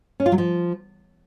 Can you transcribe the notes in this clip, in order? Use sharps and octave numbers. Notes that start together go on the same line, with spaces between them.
C#4
F4
F#3
F3